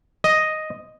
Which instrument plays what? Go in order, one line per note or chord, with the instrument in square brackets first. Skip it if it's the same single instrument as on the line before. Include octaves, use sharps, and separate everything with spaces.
[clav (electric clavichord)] D#5